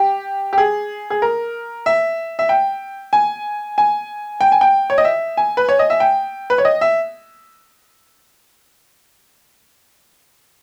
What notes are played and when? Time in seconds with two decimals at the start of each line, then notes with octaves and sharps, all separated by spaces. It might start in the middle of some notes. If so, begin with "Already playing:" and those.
Already playing: G4
0.53 G4
0.58 G#4
1.10 G#4
1.22 A#4
1.86 E5
2.39 E5
2.49 G5
3.13 G#5
3.78 G#5
4.41 G5
4.52 G#5
4.61 G5
4.90 C#5
4.98 D#5
5.04 E5
5.37 G#5
5.57 B4
5.69 C#5
5.79 D#5
5.90 E5
6.00 G5
6.50 B4
6.58 C#5
6.65 D#5
6.81 E5